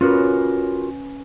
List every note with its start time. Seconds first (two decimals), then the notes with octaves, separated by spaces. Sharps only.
0.01 C#4 F4 F#4 A#4 B4